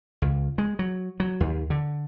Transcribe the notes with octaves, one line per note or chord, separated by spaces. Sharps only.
C#2
G#3
F#3
F#3
D#2
D3